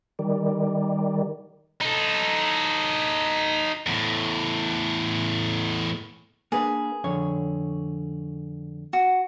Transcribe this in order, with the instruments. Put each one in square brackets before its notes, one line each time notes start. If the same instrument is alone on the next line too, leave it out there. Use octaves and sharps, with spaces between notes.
[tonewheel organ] D#3 G3
[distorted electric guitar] D#4 A4
E2 A2
[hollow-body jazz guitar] A#3 D4 B4 [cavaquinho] G#4
[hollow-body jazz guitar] F2 D3 C#5
[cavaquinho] F#4